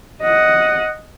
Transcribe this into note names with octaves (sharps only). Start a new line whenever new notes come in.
D#5 F#5